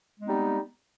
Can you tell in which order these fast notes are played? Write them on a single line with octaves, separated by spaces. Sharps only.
G#3 B3 C4 D#4 G3